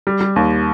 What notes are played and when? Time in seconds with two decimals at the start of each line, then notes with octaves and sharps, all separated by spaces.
0.07 G3
0.21 G3
0.36 D#2